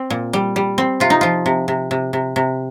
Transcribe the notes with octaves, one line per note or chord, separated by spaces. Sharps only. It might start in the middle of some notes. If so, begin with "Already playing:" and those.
Already playing: C4
A#2
G3
G3
C4
C3 F4
D#4
F3 F4
C3
C3
C3
C3
C3